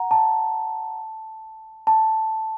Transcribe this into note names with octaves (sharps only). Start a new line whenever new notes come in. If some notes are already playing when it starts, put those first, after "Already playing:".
Already playing: F#5 A#5
A5
A5